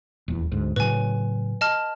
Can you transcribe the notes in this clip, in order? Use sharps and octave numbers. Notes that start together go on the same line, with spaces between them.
D#1 E2
D2 G#2
A2 C#3 F#3 B4 G#5
D#5 A5 F6